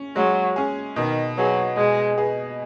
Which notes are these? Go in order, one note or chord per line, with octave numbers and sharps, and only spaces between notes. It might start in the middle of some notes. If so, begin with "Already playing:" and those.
Already playing: C#4
F#3 G#3
C#4 G#4
B2 D#3
F#3 B3 G#4
B2 G#3
B3 G#4